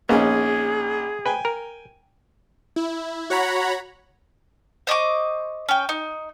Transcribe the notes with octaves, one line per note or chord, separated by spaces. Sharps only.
A#1 A#3 B3 C#4 D#4 G#4
B4 G5 G#5
A#4
E4
F#4 C#5 F#5 A#5 B5
C5 D#5 C#6 D6
C#4 G5
D#4